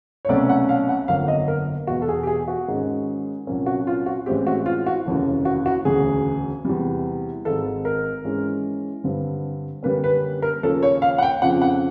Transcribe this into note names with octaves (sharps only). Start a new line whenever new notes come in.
C#5
C2 B2 F#3 A3 C#4 D5
F#5
F5
F#5
G1 F2 D3 F#3 A#3 F5
D#5
A#4
E1 E2 B2 F#4
A4
G#4
G4
G#4
F#4
G#2 D#3 G#3 C#4
C2 A#2 F#3 A#3 C#4
F#4
F4
F#4
A1 A2 E3 G#3 C4 G4
F#4
F4
F#4
F1 D#2 C#3 E3
F#4
F#4
E1 D2 C#3 G#4
E2 C3 E3 G3
G#1 G#2 D#3 G#3 A4
A#4
G#2 E3 G#3 C#4
G2 D3 G3 C4
F#2 D3 G3 A#3 C#4 B4
B4
A#4
D#2 C#3 F3 A#3 C#4 A4
C#5
F5
F#5
G5
F2 C#3 F3 F#5
F#5